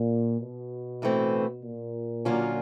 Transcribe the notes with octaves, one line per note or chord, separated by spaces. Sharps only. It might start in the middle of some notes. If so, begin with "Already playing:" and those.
Already playing: A#2
B2
A2 E3 A3 C4
A#2
D3 F#3 A#3 C#4 F4